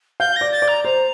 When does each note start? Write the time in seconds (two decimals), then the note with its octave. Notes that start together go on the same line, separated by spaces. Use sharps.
0.20 F5 G6
0.36 D5 A#6
0.53 A6
0.62 D5
0.68 A#5
0.84 C5 A#5